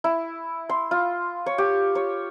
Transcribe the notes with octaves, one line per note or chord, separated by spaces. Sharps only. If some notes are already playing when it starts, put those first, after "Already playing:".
E4
C6
F4
C#5
G4
C#5